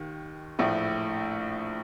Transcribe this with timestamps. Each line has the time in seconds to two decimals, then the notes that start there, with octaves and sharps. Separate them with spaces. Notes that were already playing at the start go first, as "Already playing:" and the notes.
Already playing: D#2 D#3
0.59 A#1 A2 A3